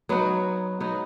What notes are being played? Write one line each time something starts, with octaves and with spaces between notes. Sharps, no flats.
F#3 B3 D#4 F#4
F#3 B3 D#4 F#4